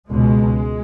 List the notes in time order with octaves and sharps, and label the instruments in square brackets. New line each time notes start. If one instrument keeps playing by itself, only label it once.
[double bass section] C#2 B2 G#3